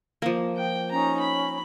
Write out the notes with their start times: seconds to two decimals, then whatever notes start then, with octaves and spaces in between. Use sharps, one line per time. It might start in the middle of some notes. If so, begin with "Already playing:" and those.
0.22 F3 A#3
0.56 G5
0.91 C#4 D#4 A#5
1.20 B5